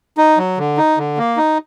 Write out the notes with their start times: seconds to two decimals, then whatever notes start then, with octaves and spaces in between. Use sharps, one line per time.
0.18 D#4
0.38 F#3
0.58 D3
0.78 D#4
0.98 D3
1.18 A#3
1.37 D#4